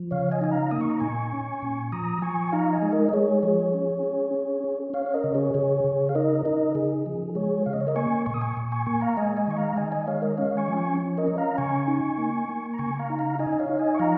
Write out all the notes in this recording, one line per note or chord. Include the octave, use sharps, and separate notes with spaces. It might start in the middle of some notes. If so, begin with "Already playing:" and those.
Already playing: F3
C#3 C#5 F5
D#5 G#5
D#4 G#5
F5 A#5
A#3 D#6
C#6
A#5
A#2 G#5 C#6
C#4
A#2
F3 A#5 D#6
F3 G#5 C#6
G#5
D#4 F5 A#5
D#5 G#5
G#3
A#4 D#5
D#5
G#3 G#4 C#5
F3 G#4 C#5
C#4
C#4
C#4
C#4
C#4 C#5 F5
C#5
A#4 D#5
C#3
G#4 C#5
C#3 G#4 C#5
C#3
F5
D#4 A#4 D#5
D#4 A#4 D#5
C#3 G#4
F3
G#3 G#4 C#5
C#3 F5
D#5
C#5
A#4 D#5
A#3 G#5 C#6
A#2 C#6
D#6
G#5 C#6
A#2
G#5 C#6
A#3 G#5 C#6
F5 A#5
G#3 D#5 G#5
D#5 G#5
D#3 C#6
F5 A#5
D#3 D#5 G#5
D#5 G#5
G#3 C#5 F5
A#4 D#5
C#4 C#5 F5
G#5 C#6
F3
G#5 C#6
C#4
A#4 D#5
C#4
F5 A#5
C#3 G#5 C#6
D#4
A#3
A#3
A#5
C#3 G#5 C#6
F5 A#5
D#4
F5 A#5
D#4 D#5 G#5
D#5
C#5 F5
D#4
D#5 G#5
C#6
F3 F5 A#5